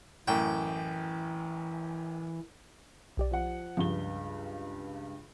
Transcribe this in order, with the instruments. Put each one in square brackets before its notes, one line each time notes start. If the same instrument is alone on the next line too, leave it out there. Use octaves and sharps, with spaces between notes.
[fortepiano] A1 F#2 [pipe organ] E3 [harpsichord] G5
[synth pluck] B1 G4 D5
[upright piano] F3 F#5
[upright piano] C#2 G2 G7 [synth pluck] F3